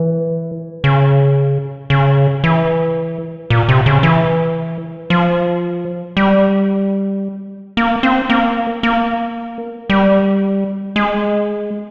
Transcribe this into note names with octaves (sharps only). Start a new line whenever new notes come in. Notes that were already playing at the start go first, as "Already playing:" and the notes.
Already playing: E3
C#3
C#3
E3
A#2
C3
C#3
E3
F3
G3
A#3
C4
A#3
A#3
G3
G#3